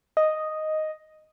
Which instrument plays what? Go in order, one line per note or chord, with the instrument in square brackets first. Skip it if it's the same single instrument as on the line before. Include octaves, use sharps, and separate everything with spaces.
[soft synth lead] D#5